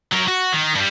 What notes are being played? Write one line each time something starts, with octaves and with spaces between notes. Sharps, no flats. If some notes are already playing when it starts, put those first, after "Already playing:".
F#3 A#4
F#4
D#3
G2 G3